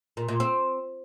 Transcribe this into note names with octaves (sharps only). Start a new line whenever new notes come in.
A#2
A#2
C4